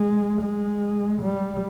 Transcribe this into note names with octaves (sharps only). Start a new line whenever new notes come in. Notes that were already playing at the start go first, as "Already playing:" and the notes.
Already playing: G#3
G#3
G3